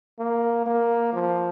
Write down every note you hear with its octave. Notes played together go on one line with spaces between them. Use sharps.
A#3
A#3
F3